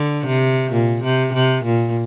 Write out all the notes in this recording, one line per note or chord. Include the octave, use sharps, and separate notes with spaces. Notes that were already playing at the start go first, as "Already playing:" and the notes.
Already playing: D3
C3
A#2
C3
C3
A#2